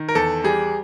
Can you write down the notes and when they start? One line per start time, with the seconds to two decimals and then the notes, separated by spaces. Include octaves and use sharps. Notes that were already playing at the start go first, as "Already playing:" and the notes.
Already playing: D#3
0.09 A#4
0.15 E2 A4
0.44 G3 G#4